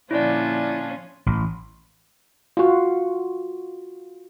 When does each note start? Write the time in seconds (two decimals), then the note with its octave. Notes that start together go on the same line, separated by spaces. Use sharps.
0.11 A#2 D3 F3 C#4 D4 E4 F4 D5
1.26 A1
2.57 F4 F#4